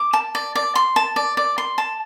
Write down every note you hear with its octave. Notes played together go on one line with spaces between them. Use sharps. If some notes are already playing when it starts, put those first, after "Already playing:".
Already playing: D6
A5
D5
D5
C6
A5
D5
D5
C6
A5